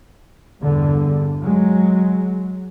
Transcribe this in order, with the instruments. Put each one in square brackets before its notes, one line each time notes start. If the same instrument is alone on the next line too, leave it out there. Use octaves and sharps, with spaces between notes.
[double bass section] E2 G2 D3
F#3 G#3